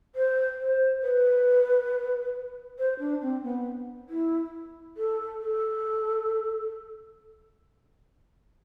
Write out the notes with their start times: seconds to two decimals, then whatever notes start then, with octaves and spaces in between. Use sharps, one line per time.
0.15 C5
0.59 C5
1.03 B4
2.79 C5
2.99 D4
3.22 C4
3.44 B3
4.09 E4
4.97 A4
5.41 A4